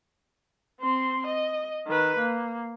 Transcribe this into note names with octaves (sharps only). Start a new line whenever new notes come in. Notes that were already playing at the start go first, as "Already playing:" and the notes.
C4 C6
D#5
D#3 B4
A#3